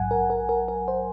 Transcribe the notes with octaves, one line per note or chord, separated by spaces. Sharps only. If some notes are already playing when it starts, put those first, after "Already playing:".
Already playing: A#1 G#2 F#3 F#5 G#5
A#4
A#4
A#4
A#4
C5